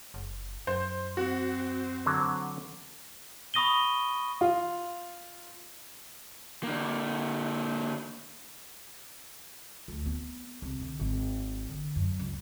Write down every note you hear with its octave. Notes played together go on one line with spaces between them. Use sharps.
F#1
F#2 C5
C4 F#4
D3 F#3
B5 C#6 D#6 A#6 D#7 G7
F4
D3 A#3
D2
B3
C2
D3
G#1
D3
F#2
C#2